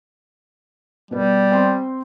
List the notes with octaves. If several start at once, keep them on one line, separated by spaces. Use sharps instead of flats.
B2 G3 B3
C4 G5 C6